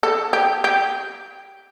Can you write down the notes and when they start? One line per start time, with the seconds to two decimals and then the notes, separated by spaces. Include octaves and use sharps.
0.03 A4
0.33 G4
0.64 G4